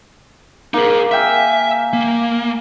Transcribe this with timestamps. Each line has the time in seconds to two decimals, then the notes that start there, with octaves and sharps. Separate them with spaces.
0.74 A#3 D#4 G#4
1.11 E5 F5 G5 G#5
1.93 A#3